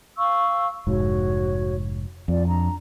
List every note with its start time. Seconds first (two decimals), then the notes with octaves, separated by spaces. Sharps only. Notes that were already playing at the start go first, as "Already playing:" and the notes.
0.17 F5 C#6 E6
0.87 F1 G#2 F#4 C#5
2.28 F2 F4 D5
2.49 D4 A#5